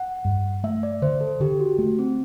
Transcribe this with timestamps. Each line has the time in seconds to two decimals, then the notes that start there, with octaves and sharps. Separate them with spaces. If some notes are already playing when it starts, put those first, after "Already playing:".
Already playing: F#5
0.25 G2
0.64 A3 E5
0.83 D5
1.02 D3 C5
1.21 A4
1.40 D3 G4
1.60 F#4
1.78 A3
1.99 C4